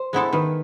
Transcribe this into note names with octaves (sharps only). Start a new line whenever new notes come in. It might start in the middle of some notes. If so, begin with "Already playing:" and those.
Already playing: C5
G#3 B3 E4 A4
D#3 B4